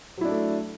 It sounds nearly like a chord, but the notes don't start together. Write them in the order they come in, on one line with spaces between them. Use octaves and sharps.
F#3 E4 D4 A3 A4